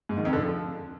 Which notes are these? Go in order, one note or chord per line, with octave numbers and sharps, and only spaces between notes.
G#2
D#3
F2
D3
F3